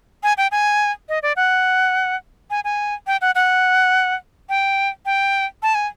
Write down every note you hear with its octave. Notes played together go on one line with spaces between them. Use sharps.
G#5
G5
G#5
D#5
D5
F#5
G#5
G#5
G5
F#5
F#5
G5
G5
A5
G#5